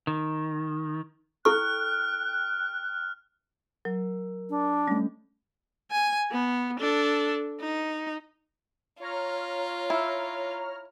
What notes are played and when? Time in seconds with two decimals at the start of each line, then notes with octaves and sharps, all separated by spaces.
0.07 D#3
1.45 E4 A4 G5 C#6 F6 F#6
3.85 F#3 A#4
4.50 D4
4.88 G3 A3 C#4
5.92 G#5
6.31 B3
6.80 D4 A4
7.61 D#4
9.00 F4 C#5 A#5 F6
9.90 E4